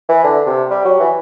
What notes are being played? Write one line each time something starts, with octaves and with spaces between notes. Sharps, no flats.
E3
D3
C3
G3
F#3
E3